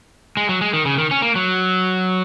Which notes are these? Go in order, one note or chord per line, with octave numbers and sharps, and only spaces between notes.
G#3
F#3
G#3
D#3
C#3
D#3
C#4
A#3
F#3